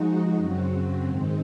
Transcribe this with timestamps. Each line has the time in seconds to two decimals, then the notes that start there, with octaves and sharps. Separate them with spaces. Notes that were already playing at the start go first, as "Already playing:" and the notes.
Already playing: F3 G#3 D#4 F#4
0.36 F#2 C#3 F#3 C4 F#4
1.07 G#2 D#3 G#3 C4